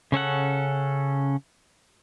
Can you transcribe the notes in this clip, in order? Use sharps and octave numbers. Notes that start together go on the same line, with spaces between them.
C#3 C#4 A4 F#5